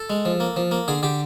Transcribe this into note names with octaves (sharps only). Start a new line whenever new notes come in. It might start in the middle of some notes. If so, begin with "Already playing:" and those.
Already playing: A4
G#3
F3
A#3
F3
A#3
D3 G#4
D3 G4